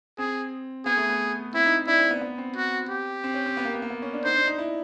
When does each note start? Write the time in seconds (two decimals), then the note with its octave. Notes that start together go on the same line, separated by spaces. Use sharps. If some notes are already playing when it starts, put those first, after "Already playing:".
0.18 C4 G#4
0.86 B3 G#4
0.97 A3
1.09 B3
1.54 C4 E4
1.66 D#4
1.87 D4 E4
1.99 C4
2.11 B3
2.21 B3
2.38 C4
2.56 F#4
2.89 G4
3.24 C4
3.34 C#4
3.46 C4
3.57 B3
3.65 A#3
3.74 B3
3.82 A#3
3.90 B3
4.02 C#4
4.14 D4
4.25 D#4 C5
4.36 D4
4.47 D#4
4.58 E4